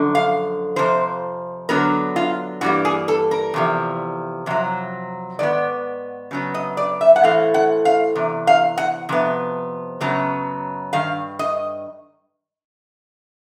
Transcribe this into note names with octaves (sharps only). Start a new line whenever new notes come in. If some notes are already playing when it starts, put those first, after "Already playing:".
Already playing: F#2 D3 F3
F5
F2 C3 F3 C5
D3 F#3 B3 A#4
F4
G2 E3 G3 A#3 F#4
G#4
A4
A#4
E2 C3 F3
F2 C3 F#3
G#2 D#3 B3 D5
C#3 F#3 B3
D#5
D5
E5
F#5
A2 E3 A3 C4 F5
F#5
F5
E2 C3
F5
F#5
F2 C3 B3
F#2 C#3 F#3 B3
G2 D#3 F5
D#5